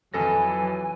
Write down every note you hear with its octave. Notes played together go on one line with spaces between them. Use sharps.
F2 E3 F#3 A4 G#5 A#6